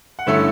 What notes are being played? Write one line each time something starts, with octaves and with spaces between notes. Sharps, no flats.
F#5
G2 D3 A3 C#4 E4 E5